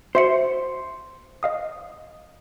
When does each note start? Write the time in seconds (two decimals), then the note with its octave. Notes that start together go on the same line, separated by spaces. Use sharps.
0.15 F#4 C5 E5 C#7
1.43 D#5 F5 D#6